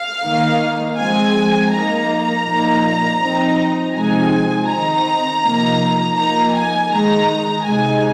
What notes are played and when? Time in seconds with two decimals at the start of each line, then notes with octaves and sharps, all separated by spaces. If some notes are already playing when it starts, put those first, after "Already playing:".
Already playing: F5
0.23 D#3 A#3 D#4
0.97 F3 G#3 C4 G#5
1.72 F3 A#3 D#4 A#5
2.45 A#2 F3 A#3 D#4
3.20 F3 C4 D#4
3.94 C3 F3 G#3 C4 D#4 G#5
4.68 D#3 C4 D#4 A#5
5.42 C3 F3 A#3 D#4
6.16 F3 A#3 D#4 A#5
6.53 G#5
6.91 D#3 G#3 D#4 A#5
7.65 C3 G#3 D#4 G#5